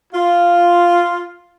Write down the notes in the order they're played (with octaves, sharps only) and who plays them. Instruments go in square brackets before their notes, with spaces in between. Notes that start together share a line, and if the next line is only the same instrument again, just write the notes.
[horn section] F4